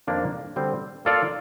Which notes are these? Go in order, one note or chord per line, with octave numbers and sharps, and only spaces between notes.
F2 D#3 A#3 D4 F4
D3 G3 C4
A#3 F4 A4 D5 F5